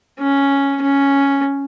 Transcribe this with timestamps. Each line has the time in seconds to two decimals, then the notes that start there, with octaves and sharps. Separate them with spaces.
0.19 C#4
0.82 C#4